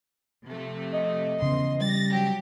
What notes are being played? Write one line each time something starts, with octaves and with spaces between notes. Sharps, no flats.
C3 F3 A3
D#5
E2 C#3 C6
G3 A6 A#6
F#3 G4